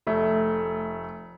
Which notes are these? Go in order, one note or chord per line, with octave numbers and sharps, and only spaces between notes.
F1 A3